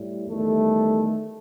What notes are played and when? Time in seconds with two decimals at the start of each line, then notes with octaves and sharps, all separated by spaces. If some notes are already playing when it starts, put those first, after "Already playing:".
Already playing: A2 G3
0.28 E2 D#3 G3 A3